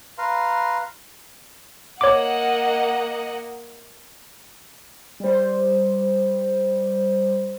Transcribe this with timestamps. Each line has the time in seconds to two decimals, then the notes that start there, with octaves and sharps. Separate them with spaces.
0.18 B4 F5 A#5 C6
2.01 A#3 C#5 D#5 F#5 D6
5.20 G3 C5